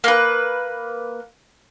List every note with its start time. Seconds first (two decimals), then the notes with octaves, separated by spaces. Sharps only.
0.04 A#3 B4